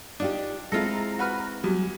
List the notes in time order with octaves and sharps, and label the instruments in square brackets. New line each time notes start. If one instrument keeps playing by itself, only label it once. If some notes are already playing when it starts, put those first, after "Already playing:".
[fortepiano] D4 [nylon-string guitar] D#4 F4 G4
[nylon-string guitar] G#3 C4 E4 [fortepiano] F4 A4 [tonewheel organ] A#5
[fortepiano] F#4 B4 F6
[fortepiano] E2 [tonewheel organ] F#3 G3